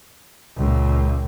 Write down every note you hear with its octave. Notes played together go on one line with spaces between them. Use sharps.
C#2 A#2